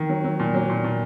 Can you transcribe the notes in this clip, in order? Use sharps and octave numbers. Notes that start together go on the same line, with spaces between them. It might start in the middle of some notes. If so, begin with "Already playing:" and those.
Already playing: D#3
F#3
F#3
A#2
F#3
A#2
A#2